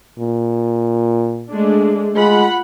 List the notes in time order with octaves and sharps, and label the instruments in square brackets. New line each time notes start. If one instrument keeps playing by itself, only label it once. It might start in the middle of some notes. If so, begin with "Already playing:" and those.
[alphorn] A#2
[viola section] G#3 A3 D4
[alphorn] G#3 [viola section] F4 F#5 B5